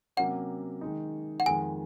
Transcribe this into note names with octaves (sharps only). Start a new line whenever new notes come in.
C3 F#3 A#3 C#4 F#5
D#3 G#3 D#4
F#5
F2 D#3 G#3 G#5